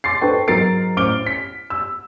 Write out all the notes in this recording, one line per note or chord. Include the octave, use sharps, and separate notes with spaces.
C6 D6 A6 C7
D4 A4 B4 C5 G5 C#6
G#2 F#3 A#4 A6 C7 D7
A1 C5 D6 F6 D7 G7
B6
E6